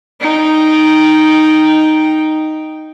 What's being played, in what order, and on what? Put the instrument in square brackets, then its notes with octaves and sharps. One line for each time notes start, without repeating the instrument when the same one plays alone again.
[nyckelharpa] D#4 G5